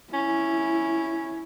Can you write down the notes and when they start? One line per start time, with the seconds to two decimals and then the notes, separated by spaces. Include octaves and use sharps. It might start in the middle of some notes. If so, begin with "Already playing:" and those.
0.13 C#4 E4